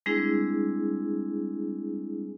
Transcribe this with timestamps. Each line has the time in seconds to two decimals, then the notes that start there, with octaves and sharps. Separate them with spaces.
0.06 G3 G#3 C4 D4 E4 G#4